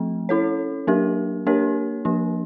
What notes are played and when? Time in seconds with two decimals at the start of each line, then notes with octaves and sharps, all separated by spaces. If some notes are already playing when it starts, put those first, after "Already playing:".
Already playing: F3 A3 C4
0.29 C#4 E4 A4 C#5
0.87 F#3 A#3 D4 G4 A#4
1.47 A#3 D4 G4 A#4 C#5
2.05 F3 A#3 D4